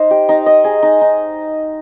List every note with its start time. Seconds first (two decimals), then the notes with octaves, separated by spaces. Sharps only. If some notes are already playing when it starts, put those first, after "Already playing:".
Already playing: D#4 C5
0.11 G4
0.29 D#4
0.46 D#5
0.64 G#4
0.83 D#4
1.01 D#4